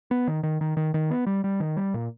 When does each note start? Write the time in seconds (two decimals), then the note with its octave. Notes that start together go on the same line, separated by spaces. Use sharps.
0.11 B3
0.28 D#3
0.43 D#3
0.61 D#3
0.77 D#3
0.94 D#3
1.10 B3
1.27 G3
1.44 G3
1.60 D#3
1.77 G3
1.94 A#2